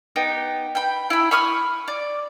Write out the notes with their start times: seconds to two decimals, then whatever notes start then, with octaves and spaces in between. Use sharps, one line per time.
0.16 B3 D#4 G4
0.75 G5 B5
1.10 E4 B5
1.31 B5 C#6 D#6 F6
1.88 D5